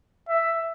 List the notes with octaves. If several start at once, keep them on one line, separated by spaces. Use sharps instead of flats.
E5